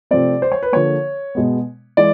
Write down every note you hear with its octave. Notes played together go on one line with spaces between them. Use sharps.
C3 F3 A3 C4 D5
C5
C#5
B4
D3 F3 A#3 C#5
B2 G#3 B3
E3 G#3 D5